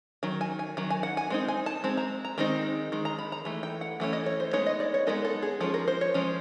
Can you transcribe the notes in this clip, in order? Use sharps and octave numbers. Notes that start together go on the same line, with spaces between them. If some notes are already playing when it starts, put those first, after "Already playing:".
D#3 F#3
G#5
G#5
D#3 F#3
G#5
F#5
G#5
G#3 C4 D#4
G#5
A5
G#3 C4
A#5
A#5
D#3 G#3 C4 D#4
D#3 G#3
A#5
B5
A#5
E3 A3
G5
F#5
E3 A3 C#4
D#5
C#5
C5
G#3 B3 D#4 C#5
D#5
D5
C#5
G#3 B3 D#4 A#4
A4
G#4
F3 G#3 C#4 A4
A#4
C5
C#5
F3 G#3 C#4